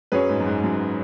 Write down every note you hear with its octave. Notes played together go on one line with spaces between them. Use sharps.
F#2 F#3 C#4 G#4 B4
G#2
F#2
G#2
F#2